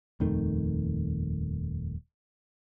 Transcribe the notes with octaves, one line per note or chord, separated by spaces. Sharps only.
D#1 F2 D#3 A3